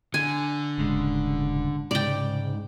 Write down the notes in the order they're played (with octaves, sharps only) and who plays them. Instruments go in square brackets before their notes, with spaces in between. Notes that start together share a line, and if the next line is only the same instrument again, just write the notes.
[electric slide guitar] D3 [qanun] G#5
[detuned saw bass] D#1 [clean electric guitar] G#2 C#3 G#3
[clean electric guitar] C2 C#3 [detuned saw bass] G#2 [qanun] D5 G5